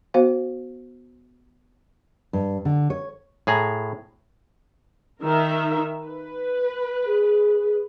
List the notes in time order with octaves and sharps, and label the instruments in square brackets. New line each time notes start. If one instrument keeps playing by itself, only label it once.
[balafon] B3 F#4 C5 F5
[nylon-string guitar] G2
D3
C#5
[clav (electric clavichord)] A2 G#4 G#5 A#5
[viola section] D#3 A#4 E5
B4
[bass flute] G#4